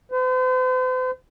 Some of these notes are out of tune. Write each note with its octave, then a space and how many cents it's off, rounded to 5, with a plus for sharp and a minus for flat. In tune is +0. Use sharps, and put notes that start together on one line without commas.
C5 -45